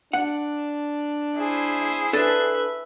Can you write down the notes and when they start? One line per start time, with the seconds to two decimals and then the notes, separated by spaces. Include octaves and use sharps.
0.13 D4 F#5
1.36 E4 G#4 C5
2.13 D4 A4 B4 E5